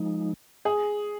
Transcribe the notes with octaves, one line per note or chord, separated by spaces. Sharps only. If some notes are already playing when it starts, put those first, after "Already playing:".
Already playing: F3 G#3 D#4
G#4